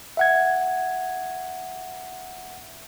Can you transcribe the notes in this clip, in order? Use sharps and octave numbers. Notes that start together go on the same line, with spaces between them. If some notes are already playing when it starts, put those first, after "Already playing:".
E5 F#5 G#6